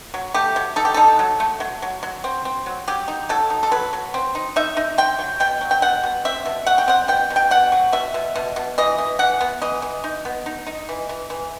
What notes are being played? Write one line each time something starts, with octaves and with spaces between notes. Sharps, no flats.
F#3
A3 G4
F#3
D#4 A4
G4
D#4 A4
F#3
A3
F#3
F#3
F#3
C4
C4
F#3
F#3 G4
D#4
F#3 A4
D#4
A4
F#3 B4
F#3
C4
D#4
D#4 E5
D#4
C4 G5
F#3
B2 G5
F#3
G5
B2 F#5
B2
C4 E5
B2
F#3 F#5
G5
C4 F#5
B2 G5
B2
G5
B2 F#5
F#3
B2 E5
B2
B2
B2
E3 D#5
E3
E3 F#5
B3
E3 D#5
E3
D#4
B3
D#4
D#4
E3
E3
E3